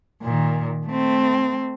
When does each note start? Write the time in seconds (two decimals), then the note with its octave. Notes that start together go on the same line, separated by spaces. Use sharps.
0.23 A#2 D#3
0.87 A3 C4